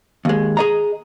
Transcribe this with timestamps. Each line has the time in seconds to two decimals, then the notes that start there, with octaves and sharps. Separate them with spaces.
0.25 D#2 G#3
0.57 G#4 D#5 A#5